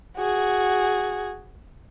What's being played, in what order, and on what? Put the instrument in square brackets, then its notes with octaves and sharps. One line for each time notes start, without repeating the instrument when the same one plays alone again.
[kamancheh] F#4 G#4